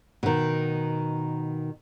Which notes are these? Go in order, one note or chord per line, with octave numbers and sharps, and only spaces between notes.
B2 D#3